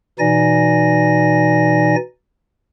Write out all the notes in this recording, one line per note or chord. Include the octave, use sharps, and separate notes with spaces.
B2 E3 D#4 D5 G#5 A#6